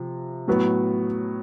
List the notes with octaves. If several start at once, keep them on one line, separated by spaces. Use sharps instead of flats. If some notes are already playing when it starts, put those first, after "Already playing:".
Already playing: C3 F3
A2 F#3 B3